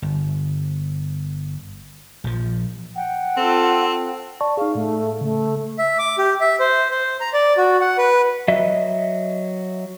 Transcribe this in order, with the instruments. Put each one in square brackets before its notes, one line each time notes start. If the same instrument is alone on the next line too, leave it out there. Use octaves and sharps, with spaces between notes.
[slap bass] G1
A#1 F3
[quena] F#5 [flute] G5
[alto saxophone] C4 [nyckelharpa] F4 A4
[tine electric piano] D5 A5 C#6
[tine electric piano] D#4 G#4 [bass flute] F5
[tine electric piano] A2 [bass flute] A3
[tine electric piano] C#3 [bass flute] A3
[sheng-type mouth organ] E5
D6
G4
E5
C5
C5
A#5
D5
F#4
F#5
B4
[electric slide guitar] F#3 D#5 E5